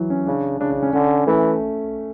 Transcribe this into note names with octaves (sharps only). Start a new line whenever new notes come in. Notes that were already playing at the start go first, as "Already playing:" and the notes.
Already playing: E3 F#3
C#4
C#3 D4
C#3 D4
D4
C#4
D3 C#4
E3 A3